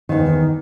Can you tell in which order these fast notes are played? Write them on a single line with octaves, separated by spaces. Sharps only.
D#3 G#2 E2